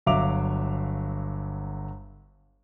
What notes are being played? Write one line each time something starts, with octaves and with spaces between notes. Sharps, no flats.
G1 F#3 E5 F5 D6 F7